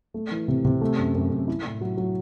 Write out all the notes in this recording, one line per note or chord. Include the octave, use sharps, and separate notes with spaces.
A3
E3
C3
C3
A3
F#2
F#2
F#2
E4
A2
F#3
F#3